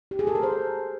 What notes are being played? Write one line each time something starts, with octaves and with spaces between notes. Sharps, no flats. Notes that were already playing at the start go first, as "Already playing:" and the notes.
G4
G#4
A4
A#4
C5